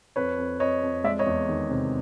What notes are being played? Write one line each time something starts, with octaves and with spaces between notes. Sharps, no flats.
F2 B4 C#5
F2
F2 C#5 D#5
F2
G#3 D5 E5
C#5 D#5
E2
D#3
C3